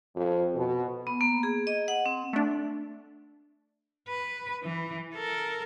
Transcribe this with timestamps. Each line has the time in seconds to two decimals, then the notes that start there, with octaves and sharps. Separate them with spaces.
0.15 F2
0.55 B2
1.07 B3
1.21 A#3
1.43 G#4
1.67 D#5
1.88 F#5
2.06 C4
2.33 A3 D4
4.08 B4
4.63 E3
5.15 A4 A#4